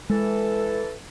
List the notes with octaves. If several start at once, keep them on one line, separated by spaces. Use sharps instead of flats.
E3 G#3 A4